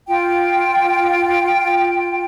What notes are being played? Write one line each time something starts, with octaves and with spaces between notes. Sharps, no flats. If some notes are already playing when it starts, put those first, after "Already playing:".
F4 G5